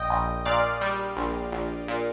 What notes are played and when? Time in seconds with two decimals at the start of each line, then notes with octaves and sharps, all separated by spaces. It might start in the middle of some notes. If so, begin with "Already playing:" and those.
Already playing: A#1 D#5 G5
0.10 A#1
0.46 A#2 D5 F5
0.81 G3
1.17 A#1
1.52 A#1
1.88 A#2